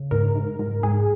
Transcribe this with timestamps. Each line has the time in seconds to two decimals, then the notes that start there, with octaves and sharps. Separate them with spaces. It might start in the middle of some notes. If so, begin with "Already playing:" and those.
Already playing: C#3
0.11 G#2 A#4
0.36 G#2
0.59 G#2
0.83 G#2 G#4